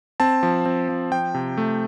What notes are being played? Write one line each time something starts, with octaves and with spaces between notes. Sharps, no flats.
C4 A5
F3
C4
F3
F3 G5
C3
A3